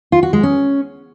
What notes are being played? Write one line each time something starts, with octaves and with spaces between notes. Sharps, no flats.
F4
F#4
G#3
C#4